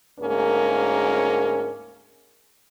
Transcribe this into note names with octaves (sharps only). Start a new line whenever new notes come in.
D2 G#2 A#3 C#4 G#4 A#4